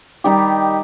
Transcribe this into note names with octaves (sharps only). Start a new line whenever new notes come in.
D#3 G3 D#4 G4